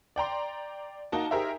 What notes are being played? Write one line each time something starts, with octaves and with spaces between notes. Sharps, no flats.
D5 G5 A#5 C6
A#3 D#4 F#4 A5
D#4 G4 G#4 A#4 C5 E5